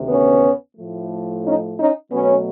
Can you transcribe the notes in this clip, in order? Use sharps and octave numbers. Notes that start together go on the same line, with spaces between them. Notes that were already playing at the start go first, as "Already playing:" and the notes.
Already playing: D2 C3 D#3
B3 C#4
A2 F3 A3
C#4 D#4
C#4 D#4
B2 F#3 A3 B3 C#4